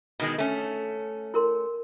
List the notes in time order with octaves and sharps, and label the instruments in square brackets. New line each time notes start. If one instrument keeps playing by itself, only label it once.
[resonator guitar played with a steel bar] B2 D#3 G#3
A3 C#4
[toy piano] E4 A#4 C6